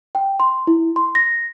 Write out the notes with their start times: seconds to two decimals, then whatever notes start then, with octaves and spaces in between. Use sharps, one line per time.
0.15 G5
0.40 C6
0.67 E4
0.96 C6
1.15 A#6